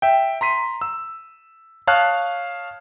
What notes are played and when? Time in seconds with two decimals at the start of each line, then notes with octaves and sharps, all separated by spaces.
0.02 E5 G5
0.41 A#5 C6 B6 D#7
0.82 E6
1.87 C#5 F5 A5 D#6 F6 F#6